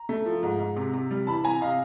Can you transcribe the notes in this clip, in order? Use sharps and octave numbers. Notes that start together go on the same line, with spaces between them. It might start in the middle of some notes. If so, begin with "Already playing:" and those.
Already playing: A#5
A3
F3
G#2
G#2
C3
C3
G3
E3 A5 B5
C3 G#5 A#5
C3 D#5 F5